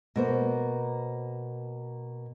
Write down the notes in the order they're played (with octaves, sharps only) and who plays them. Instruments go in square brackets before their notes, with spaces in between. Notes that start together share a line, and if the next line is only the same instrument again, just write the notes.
[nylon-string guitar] B2 A#3 C5